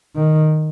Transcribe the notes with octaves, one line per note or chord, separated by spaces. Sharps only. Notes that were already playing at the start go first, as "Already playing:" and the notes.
D#3